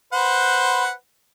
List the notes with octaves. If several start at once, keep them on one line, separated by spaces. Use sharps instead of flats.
B4 C5 F#5